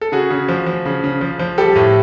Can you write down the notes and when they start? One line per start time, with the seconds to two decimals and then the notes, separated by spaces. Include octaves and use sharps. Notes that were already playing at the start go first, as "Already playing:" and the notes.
0.01 A4
0.12 C#3 F#4 G#4
0.30 C#3
0.49 F3
0.66 F3
0.85 C#3
1.04 C#3
1.21 F3
1.39 F3
1.58 G3 G4 A4
1.76 A2